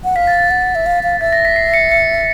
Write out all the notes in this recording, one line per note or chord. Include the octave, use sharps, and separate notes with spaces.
F#5
F5 B6
A6
A6
F#5
E5
F5
F5
E5 A6
A#6
B6
C7
C#7
C#7